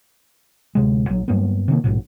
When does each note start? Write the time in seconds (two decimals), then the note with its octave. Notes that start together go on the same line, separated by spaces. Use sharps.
0.75 D1 C3 G#3
1.09 A#1 F#3
1.28 G2 F#3 A#3 B3
1.68 C3 D#3 A#3
1.84 A#1 G#2 B2